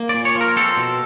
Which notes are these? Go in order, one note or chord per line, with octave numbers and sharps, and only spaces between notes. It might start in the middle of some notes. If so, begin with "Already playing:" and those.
Already playing: A#3
A#2 D5
C#5
F3
A#4
C4 A4
B2